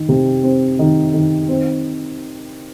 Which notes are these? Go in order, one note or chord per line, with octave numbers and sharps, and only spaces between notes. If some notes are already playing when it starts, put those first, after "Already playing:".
Already playing: D#3
C3
C4
D#3
D#3
C4